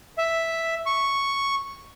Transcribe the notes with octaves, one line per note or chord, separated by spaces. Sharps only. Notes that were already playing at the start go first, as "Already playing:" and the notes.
E5
C#6